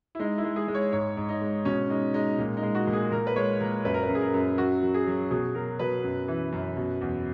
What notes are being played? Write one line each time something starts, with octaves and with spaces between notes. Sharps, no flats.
E4
G#3 D#4
E4
G#3
G#4
G#3
C#5
G#2 C#5
G#2
D#4
G#3
B2 C#4
G#3 D#4
G#3 D#4
A#2
D#4
G#3
F#4
A#2
G#4
A#2 A#4
B4
G#3 C#5
A#2 A#4
F#2 B4
A#4
B4
F#2
G#4
A#4
F#2
F#3 F#4
F#3
G#4
F#3
B2 G#4
F#3 A#4
B2 B4
F#2
E3
F#2
B2
E2